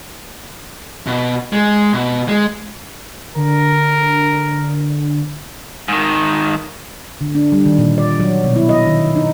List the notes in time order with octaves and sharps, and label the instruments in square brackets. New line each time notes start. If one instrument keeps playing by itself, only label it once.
[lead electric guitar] B2
G#3
B2
G#3
[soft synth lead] D3 [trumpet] A#4
[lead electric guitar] G#2 D#3
[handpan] D3
D4
G3
D#3
A#2
D5
F#3
B2
E4
D#5
D#3
D#4